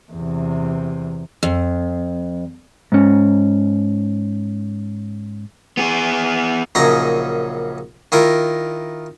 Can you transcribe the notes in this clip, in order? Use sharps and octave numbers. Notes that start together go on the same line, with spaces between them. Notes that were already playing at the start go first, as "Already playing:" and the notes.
E2 C3
F2
G#2 C#4
B3 G#4
A#1 F#2 C#3 D#4 G#4 A#5
D#3 E4 F4 A#4